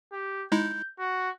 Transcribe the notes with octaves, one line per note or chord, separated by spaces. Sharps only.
G4
G#3 D#4 E4 G6
F#4